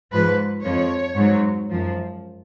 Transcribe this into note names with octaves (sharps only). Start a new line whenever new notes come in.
G#2 F3 B4
F2 F3 C#5
G#2 F#3
F#2 F3